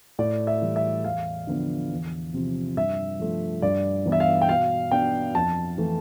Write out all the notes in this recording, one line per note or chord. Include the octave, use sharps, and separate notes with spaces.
A2 D5
E5
E3 G3
E5
E2 F5
D3 F3 B3 D4
E2
C3 F3 C4
G2 E5
F3 A3
G2 D5
E3 B3
E5
F5
G5
B2 F5
B3 D4 G5
F2 A5
E3 A3